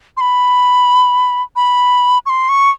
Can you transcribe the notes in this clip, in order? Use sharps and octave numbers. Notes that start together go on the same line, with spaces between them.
C6
B5
B5
C#6
C6
C#6